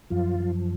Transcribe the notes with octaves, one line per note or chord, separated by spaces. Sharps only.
F#2 F3 F4
F3